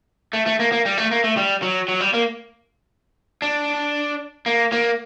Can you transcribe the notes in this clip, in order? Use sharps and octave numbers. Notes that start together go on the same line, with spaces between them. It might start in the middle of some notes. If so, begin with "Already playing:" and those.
A3
A3
A#3
A#3
G3
A3
A#3
A3
G3
F#3
F#3
G3
A#3
D4
A#3
A#3